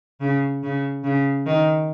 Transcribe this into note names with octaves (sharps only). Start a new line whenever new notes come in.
C#3
C#3
C#3
D#3